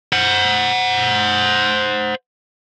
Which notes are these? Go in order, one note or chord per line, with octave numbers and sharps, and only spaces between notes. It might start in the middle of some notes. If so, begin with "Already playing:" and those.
C5 F#5